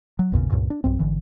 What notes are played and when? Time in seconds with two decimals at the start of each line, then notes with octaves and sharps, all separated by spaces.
0.19 F#3
0.32 A1 E2 A#2 C#3
0.52 C#2 G2 A#2
0.70 D4
0.84 B1 G2 C4
0.99 G#1 D3 E3